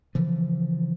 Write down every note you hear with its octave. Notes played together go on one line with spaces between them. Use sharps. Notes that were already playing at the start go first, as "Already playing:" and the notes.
C#3 E3 F3